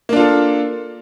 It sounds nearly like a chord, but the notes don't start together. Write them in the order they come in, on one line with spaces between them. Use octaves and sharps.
A#3 D4 F4 A4